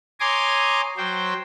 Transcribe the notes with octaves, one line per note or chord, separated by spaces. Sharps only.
C#5 G#5 A#5 C6 D6 D#6
F#3 C5 G5